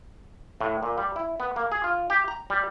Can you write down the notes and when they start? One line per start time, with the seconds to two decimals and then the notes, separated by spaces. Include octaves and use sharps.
0.61 A2
0.83 A#2
0.98 G3
1.16 E4
1.40 B3
1.56 A#3
1.72 G#4
1.84 F4
2.10 G4
2.28 A#5
2.50 G3